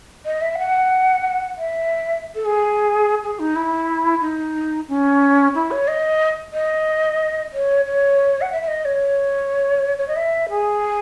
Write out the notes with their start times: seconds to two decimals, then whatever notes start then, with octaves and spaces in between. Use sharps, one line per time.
0.26 D#5
0.41 E5
0.58 F#5
1.58 E5
2.35 A4
2.45 G#4
3.23 G#4
3.39 D#4
3.55 E4
4.21 D#4
4.88 C#4
5.55 E4
5.71 C#5
5.88 D#5
6.53 D#5
7.53 C#5
7.85 C#5
8.41 F#5
8.52 E5
8.62 E5
8.68 D#5
8.85 C#5
9.98 C#5
10.08 D#5
10.16 E5
10.49 G#4